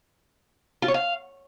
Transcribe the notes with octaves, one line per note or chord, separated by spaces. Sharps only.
F4
C#5
F5